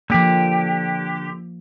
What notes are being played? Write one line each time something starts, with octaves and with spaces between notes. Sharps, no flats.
D3 F3 A#3 G4